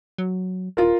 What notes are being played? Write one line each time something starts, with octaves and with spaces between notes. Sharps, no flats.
F#3
D#1 F4 A#4